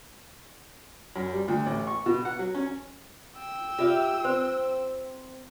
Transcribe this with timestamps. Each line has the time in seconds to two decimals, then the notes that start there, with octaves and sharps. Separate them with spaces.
1.16 F#2
1.33 G3
1.48 D2
1.66 A1
1.87 C#6
2.06 B2
2.25 F#5
2.39 F#3
2.54 C#4
3.35 G5 E6
3.78 F4 G4 E5 F5
4.25 C4 C5